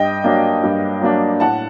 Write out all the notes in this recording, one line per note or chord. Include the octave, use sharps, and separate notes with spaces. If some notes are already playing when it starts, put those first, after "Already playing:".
Already playing: G2 D#5 G5
F#3 A#3 D4
G2
F#3 A#3 D4
A2 F#5 A5